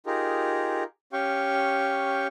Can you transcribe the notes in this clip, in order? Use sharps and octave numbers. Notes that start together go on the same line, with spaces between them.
D#4 F4 G4 G#4 A#4
C#4 G4 F5 G5 C#6